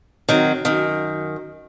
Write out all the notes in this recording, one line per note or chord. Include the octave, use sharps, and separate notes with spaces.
D#3 F#3 C4
F#2 D#3